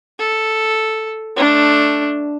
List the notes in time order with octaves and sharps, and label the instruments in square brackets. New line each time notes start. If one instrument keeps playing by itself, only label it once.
[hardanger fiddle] A4
A3 D4